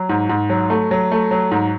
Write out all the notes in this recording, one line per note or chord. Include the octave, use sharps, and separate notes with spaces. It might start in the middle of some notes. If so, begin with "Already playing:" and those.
Already playing: F#3
G#2
G#2
F#3
A3
F#3
A3
F#3
G#2